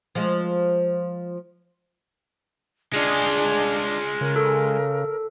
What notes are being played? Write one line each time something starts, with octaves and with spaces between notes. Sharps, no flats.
F3 G#3
G#3 D4 F4 G#4
C#3 A#4
A4